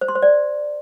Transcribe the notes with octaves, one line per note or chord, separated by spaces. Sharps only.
C5
C6
C5
D5